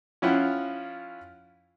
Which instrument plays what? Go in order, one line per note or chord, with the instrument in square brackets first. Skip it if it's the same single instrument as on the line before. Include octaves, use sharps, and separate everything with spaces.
[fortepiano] F3 C#4 E4 F4 F#5 G5